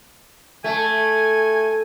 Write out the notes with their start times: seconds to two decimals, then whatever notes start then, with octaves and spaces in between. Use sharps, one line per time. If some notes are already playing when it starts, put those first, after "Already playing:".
0.64 A3 G#5